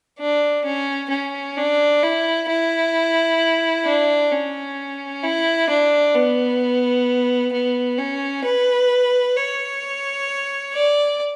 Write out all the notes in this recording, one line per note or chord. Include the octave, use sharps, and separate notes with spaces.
D4
C#4
C#4
D4
E4
E4
D4
C#4
E4
D4
B3
B3
C#4
B4
C#5
D5